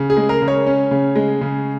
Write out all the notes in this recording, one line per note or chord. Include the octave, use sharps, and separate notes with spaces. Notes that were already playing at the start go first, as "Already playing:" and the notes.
Already playing: C#3
G#4
G#3
A#4
C#3
C#5
C#4
C#3
G#3
C#3